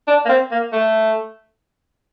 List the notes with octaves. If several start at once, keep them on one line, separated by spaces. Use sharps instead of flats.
D4
A#3
C4
A#3
A3